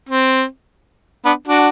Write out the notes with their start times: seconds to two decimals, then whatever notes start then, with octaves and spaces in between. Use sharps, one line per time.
0.09 C4
1.25 B3 D4
1.47 D4 F#4